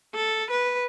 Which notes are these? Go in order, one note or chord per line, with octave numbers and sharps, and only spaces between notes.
A4
B4